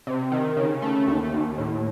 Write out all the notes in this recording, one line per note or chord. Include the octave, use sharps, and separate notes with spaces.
C3
D#3
C#3
A3
D#2
D#2
A2